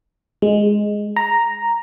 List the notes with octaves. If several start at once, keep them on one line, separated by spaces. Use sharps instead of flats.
G#3
A#5